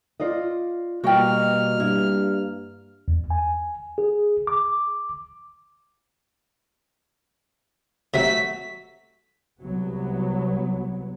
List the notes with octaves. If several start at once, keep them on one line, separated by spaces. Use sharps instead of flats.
F4 D5 D#5
B2 G3 A#3 F#4 D#5 G5 F6
G2 E4
E2
G#5
G#4
D6
C3 F#3 A3 F#4 E5 B6
C2 F#3 B3